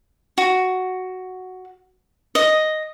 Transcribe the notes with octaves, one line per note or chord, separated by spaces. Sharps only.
F#4
D#5